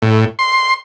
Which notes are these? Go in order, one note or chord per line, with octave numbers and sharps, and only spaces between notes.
A2
C6